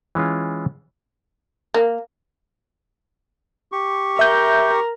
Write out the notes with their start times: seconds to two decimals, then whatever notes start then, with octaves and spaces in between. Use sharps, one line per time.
0.15 E3 G#3 C#4 F4
1.74 A#3
3.72 G4 C#6
4.19 A#4 E5 G6